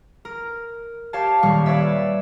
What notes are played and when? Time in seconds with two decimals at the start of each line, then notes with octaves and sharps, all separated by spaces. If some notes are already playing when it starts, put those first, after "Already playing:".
0.25 A#4
1.13 G4 C#5 F5 A5
1.43 D#1 G3 F5 C#6
1.66 B4 C#5 D5 E5